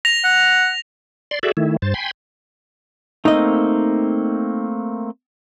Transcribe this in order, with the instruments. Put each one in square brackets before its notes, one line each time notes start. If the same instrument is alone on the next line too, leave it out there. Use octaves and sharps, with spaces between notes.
[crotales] A#6 F7
[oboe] F#5
[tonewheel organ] D5 C6
F#4 G#4 A4 D5 E5
D#3 A3 E4
G2 C5 A6
G5 G#5 B5 C6
[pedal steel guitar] A3 A#3 C4 [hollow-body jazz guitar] D#4 D#5